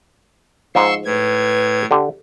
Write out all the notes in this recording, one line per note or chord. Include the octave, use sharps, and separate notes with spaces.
G#2 F3 C6 C#6 E6
A2 B4 G#6
D3 G4